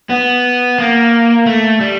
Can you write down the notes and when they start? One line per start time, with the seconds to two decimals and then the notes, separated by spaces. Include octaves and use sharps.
0.10 B3
0.78 A#3
1.46 A3
1.80 G3